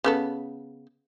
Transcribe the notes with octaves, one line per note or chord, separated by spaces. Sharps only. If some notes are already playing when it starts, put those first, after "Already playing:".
C#3 B3 A4